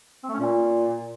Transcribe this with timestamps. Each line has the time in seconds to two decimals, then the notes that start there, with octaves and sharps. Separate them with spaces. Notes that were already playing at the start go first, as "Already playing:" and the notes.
0.23 C4
0.29 A3
0.34 C#4
0.39 A#2